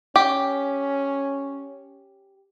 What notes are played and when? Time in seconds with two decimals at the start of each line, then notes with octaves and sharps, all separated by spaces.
0.16 C#4 G4